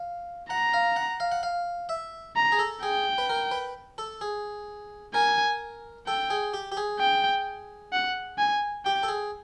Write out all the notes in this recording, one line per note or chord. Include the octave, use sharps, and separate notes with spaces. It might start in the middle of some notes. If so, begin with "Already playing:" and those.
Already playing: F5
F#5 A#5
F5
F#5
F5
F#5
F5
E5
A#5
G#4
A4
G#4 G5
B4
A#4
B4
A4
G#4
A#4 G#5
A4 G5
G#4
G4
G4
G#4
G5
F#5
G#5
G4 G5
A4
G#4